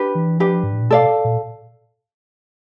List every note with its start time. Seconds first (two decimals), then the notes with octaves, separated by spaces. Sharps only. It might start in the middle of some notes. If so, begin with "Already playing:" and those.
Already playing: D4 G4 B4
0.15 E3
0.39 F3 D4 G4 B4
0.64 G#2
0.73 A2
0.82 A#2
0.90 B2 A4 D5 F5
1.25 A#2